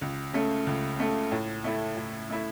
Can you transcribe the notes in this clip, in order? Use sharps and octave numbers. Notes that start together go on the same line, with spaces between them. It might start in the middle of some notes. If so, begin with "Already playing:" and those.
C#2
C#3 A3
C#2
C#3 A3
A2
A3 E4
A2
A3 E4